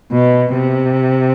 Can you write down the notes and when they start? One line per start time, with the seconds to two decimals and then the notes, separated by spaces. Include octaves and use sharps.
0.12 B2
0.54 C3